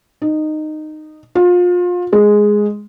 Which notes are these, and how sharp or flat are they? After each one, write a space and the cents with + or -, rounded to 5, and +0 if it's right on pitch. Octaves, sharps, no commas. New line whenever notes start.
D#4 -15
F4 +30
G#3 +0